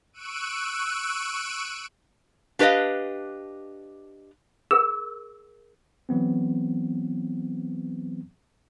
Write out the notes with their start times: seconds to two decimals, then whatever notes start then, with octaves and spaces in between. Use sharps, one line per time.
0.13 C#6 E6 F#6 D7 D#7
2.59 D4 G4 B4 C#5 D#5 F5
4.71 G#4 A#4 E6
6.09 E3 F#3 B3 C4